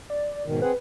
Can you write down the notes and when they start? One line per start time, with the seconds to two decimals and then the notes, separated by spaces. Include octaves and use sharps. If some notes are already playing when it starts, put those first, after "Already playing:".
0.10 D5
0.46 G#2 B2 D#3
0.62 C4 G#4 B4 F#5